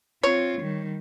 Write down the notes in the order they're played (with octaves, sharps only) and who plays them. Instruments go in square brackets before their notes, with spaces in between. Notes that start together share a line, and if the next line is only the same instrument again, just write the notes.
[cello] C4 F4 [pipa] C#5
[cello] D#3 G3